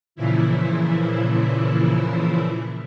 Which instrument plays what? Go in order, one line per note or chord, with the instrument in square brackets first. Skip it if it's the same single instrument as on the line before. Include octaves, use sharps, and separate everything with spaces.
[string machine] A#2 C#3 E3 F3 E4